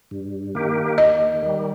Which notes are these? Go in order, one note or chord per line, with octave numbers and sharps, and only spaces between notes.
G2
D#3 A#3 G4
D#2 D#5
D#3 G3